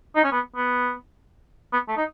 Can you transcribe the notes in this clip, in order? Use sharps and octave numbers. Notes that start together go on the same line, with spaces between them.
D#4
C#4
B3
B3
B3
A3
D#4